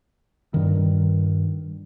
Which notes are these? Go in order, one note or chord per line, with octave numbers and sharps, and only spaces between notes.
G2 D#3